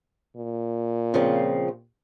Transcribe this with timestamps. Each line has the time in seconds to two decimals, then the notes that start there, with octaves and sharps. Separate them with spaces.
0.37 A#2
1.14 C#3 F3 C4